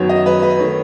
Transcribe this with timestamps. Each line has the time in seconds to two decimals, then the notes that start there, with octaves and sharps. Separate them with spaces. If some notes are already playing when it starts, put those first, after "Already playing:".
Already playing: F#2 D#3 F#3 B3 C#5
0.09 D#5
0.26 B4
0.42 B4
0.59 D#3 A3 C#5